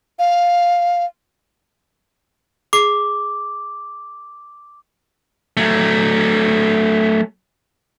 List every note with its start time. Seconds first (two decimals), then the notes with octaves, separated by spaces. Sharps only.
0.19 F5
2.73 G#4 D6 C7
5.57 F#3 A3